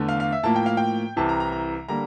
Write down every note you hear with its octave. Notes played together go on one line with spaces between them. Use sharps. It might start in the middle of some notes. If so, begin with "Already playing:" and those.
Already playing: E2 D3 A3
F5
F5
E5
A2 F3 A#3 A5
G5
F5
G5
C2 C3 E3 A5
A#5
A#5
A#5
D3 G3 A#3 A#5